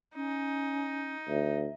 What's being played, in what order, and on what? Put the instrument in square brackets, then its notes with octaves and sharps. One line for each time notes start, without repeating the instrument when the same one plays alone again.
[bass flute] C#4 [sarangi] D#4
[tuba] D2 [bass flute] E5